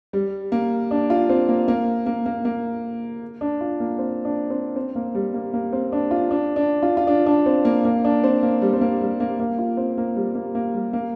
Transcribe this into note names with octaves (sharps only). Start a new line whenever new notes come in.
G3
A#3
D4
F4
C4
A#3
A#3
A#3
A#3
A#3
D4
F4
A#3
C4
D4
C4
C4
A#3
G3
A#3
A#3
C4
D4
F4
D4
D4
F4
F4
D4
D4
C4
A#3
A#3
D4
C4
A#3
G3
C4
A#3
G3
A#3
A#3
F4
C4
A#3
G3
A#3
A#3
G3
A#3